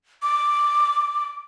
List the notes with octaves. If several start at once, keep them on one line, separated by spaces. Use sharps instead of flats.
D6